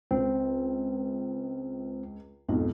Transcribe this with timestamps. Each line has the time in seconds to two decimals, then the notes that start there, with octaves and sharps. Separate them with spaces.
0.11 C#2 C4
2.48 B1 F2 G#2